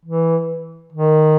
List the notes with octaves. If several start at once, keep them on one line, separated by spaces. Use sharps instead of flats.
E3
D#3